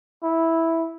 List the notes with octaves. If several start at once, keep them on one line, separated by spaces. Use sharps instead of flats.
E4